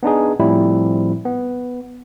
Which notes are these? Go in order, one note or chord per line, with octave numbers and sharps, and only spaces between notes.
B3 D4 D#4 G#4
A2 F3 G3 C4 E4
B3